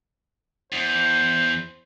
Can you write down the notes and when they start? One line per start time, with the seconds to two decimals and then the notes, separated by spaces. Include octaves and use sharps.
0.72 E2 C5